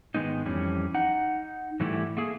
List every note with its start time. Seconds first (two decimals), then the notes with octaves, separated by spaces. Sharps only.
0.14 G#2 D#3 G#3 B3 D#4
0.45 F2 E3 G3 C#4
0.94 D#4 F#5
1.80 G#2 E3 G3 A3 E4 G4
2.17 A3 A#3 G#4